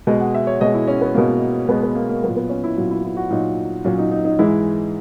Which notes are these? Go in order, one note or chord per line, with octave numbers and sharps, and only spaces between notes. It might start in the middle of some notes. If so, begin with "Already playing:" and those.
B2 G#3 D#5
F#5
E5
C#5
B2 G#3 D#5
E4
C#4
B3
B2 G#3 A#3
B2 G#3 B3
B3
A#3
A#3
A#2 F#3 B3
B3
C#4
E4
A#2 F#3 F#4
E4
E4
F#4
A#2 F#3 D#4
A#2 F#3 C#4
D#4
D#4
D#4
G#2 E3 G#3 E4